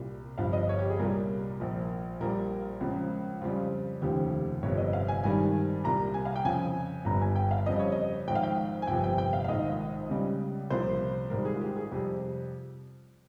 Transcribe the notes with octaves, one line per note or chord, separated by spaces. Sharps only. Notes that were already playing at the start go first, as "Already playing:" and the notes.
Already playing: C2 A#2 G3
G1 G2 F3 F5
D#5
C#5
G4
G#4
C2 A#2 G3 A#4
A#1 A#2 F3
A#1 A#2 G3 A#4
C#2 C#3 F3
F2 C#3 G3 F4
F1 D#2 C#3 F3 G4
G1 F2 C3 C#5
D#5
F5
G#5
G#1 G2 D#3 G3 G#5
C2 A#2 G3 A#5
G#5
F5
G5
F2 C#3 F3 G#5
G1 G2 G3 A#5
G#5
G5
F5
F2 C#3 G3 D#5
C#5
D#5
G#1 G#2 F3 G5
F5
G5
G#5
G1 F2 C3 F3 G5
G5
G5
F5
F5
A#1 G#2 D#3 D#5
C#2 C#3 G3
C2 A#2 F3 C5
G#1 G#2 G3 A#4
G#4
F4
G4
G#4
F2 C3 G3 G4